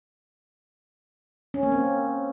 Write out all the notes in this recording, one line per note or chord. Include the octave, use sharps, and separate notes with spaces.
C#4
A#3
C4